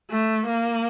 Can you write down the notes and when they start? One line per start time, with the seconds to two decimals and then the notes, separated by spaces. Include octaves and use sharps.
0.10 A3
0.47 A#3